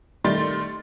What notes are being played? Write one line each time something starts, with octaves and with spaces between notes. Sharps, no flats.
D#3 G3 A3 C6 A6